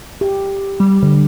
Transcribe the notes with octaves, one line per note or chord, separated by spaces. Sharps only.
G4
G3
D3